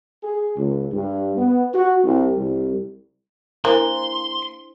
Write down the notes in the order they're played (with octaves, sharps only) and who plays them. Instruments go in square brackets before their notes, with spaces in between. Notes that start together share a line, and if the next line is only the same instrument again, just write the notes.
[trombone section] G#4
C#2
G2
B3
F#4
C2
C2
[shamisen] A#3 [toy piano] D4 E4 C5 [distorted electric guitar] C6